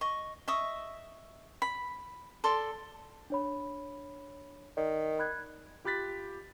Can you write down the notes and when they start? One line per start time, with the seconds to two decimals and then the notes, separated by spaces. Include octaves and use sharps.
0.01 D#5 C#6
0.48 D#5 E5 C#6 D#6
1.62 B5
2.44 A4 D5 C6
3.30 D4 C#5 B5
4.77 D#3 D5
5.19 B5 F#6 G#6
5.85 F4 G4 B5 F#6 A6 B6